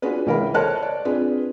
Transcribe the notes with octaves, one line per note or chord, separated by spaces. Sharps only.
D4 F4 F#4 G#4 B4
C#2 E3 A#4 F5 B5
A4 A#4 C5 C#5 A5 F#6
D5
C4 D4 F4 G#4 B4